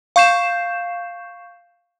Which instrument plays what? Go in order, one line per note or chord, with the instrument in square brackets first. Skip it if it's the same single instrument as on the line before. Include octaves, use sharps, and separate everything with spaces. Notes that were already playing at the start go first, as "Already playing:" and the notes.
[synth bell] F5 C#6 G6 C7 E7